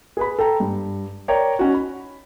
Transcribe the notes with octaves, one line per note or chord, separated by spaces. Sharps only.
G#4 B4 B5
A4 G5 A#5
G2
A#4 C#5 D5 G5 A#5
C#4 D#4 F#4
B5